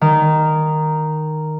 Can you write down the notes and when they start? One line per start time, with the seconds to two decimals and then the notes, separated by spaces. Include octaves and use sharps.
0.01 D#3